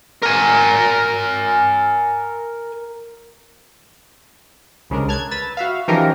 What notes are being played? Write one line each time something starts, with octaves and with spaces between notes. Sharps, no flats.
A#4 G#5
C2 C#3 G#3 D4 A#4
A5 F6 F#6 G#6
B4 E6 A6
F#4 E5 F5
E3 F3 C#4 D#4 G4 A#4